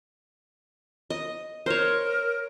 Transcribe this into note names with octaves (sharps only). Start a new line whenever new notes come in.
D#5
A#4 C5 C#5